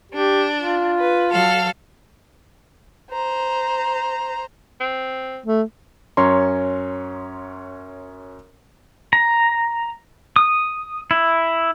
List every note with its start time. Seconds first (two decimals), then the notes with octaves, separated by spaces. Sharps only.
0.12 D4 G4
0.59 F4
0.98 B4
1.31 F#3 A4 F5
3.11 C5 A#5
4.80 C4
5.46 A3
6.17 F#2 C#4 C#5 A#5 C6
9.13 A#5
10.36 D#6
11.11 E4